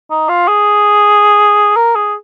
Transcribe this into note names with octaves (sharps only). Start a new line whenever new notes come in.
D#4
F4
G#4
A#4
G#4